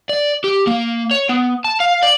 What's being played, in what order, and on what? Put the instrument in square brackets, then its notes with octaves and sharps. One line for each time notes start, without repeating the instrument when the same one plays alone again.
[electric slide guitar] D5
G4
A#3
C#5
B3
A5
F5
D5